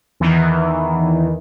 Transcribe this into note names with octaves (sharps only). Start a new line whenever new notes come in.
E2 D#3 E3